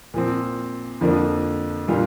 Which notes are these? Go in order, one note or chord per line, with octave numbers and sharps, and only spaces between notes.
A#2 F3 C4
F2 D3 F3 A#3 D4
A#2 G3 D4 F4